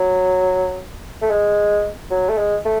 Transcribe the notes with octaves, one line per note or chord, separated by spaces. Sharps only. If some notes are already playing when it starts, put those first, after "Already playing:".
Already playing: F#3
A3
G#3
F#3
A3
G#3
A3